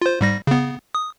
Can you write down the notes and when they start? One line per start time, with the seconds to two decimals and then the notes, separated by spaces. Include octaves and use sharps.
0.02 F4 C5
0.21 G#2 G3 A#6
0.47 C#3 B3
0.95 D#6